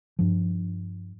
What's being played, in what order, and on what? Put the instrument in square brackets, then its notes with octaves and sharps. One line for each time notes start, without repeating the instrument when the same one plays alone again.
[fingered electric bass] G2 F3